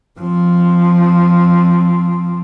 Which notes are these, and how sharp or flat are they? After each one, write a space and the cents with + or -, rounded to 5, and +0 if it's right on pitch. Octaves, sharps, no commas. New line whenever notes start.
F3 +0 C4 +0